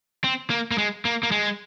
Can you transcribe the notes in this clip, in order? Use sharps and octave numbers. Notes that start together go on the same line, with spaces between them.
C4
A#3
A#3
G#3
A#3
A#3
G#3